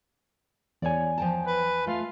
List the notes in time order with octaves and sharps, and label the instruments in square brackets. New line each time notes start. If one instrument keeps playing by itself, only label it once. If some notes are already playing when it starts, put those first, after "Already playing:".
[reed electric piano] E2 G#5 [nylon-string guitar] C#5 D5
[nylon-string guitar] F3 G5 A5
[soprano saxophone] B4
[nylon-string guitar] A3 [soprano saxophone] F4